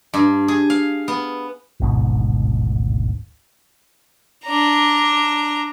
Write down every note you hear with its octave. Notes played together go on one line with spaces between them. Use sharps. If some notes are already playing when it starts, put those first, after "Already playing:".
G2
G#4
F5
B3
D1 G#1 G#2 B2
D4 A#5